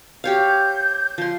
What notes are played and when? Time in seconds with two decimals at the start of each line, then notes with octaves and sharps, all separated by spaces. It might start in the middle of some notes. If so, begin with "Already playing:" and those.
0.24 G4 C#5 F5 G6
1.18 F3 C6